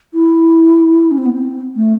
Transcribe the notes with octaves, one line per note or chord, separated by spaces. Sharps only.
E4
C#4
C4
B3
C4
A3